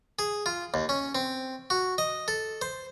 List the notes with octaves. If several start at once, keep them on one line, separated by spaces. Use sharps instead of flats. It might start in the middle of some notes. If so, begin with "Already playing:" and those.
G#4
F4
D#2
C#4
C4
F#4
D#5
A4
C5